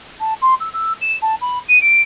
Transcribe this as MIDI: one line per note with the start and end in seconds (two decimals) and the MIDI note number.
0.20 0.34 81
0.42 0.54 84
0.60 0.71 88
0.73 0.93 88
1.01 1.16 100
1.22 1.35 81
1.41 1.59 83
1.68 1.79 99
1.81 2.02 98